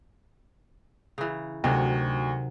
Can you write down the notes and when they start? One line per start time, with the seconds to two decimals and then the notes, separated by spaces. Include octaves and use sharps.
1.18 C#3 E3 A#5
1.64 D2 C3 D#3 F#3 F#4